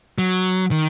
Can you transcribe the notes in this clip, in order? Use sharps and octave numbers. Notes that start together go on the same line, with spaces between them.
F#3
D#3